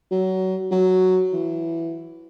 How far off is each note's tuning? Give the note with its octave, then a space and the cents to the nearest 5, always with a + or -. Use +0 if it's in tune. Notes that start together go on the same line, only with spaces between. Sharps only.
F#3 +25
F#3 +0
E3 +10